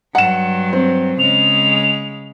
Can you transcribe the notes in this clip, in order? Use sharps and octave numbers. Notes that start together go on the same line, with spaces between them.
G2 F#3 F#5 E7
C4
C#3 G#3 F7